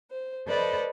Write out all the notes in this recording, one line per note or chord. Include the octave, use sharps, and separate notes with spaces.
C5
A4 B4 C5 D5 D#5